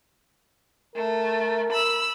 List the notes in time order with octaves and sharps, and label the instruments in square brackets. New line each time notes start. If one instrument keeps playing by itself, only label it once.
[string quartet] A3 [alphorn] A#4
[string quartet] B5 E6